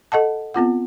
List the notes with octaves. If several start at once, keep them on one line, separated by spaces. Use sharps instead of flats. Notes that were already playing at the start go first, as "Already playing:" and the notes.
A4 D#5 F#5 A5
B3 C4 F4 F#5